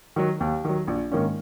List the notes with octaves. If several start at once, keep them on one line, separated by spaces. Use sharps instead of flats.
D#3 F#3
D#2
D#3 F#3
A#1
G#2 D#3 A#3 C#4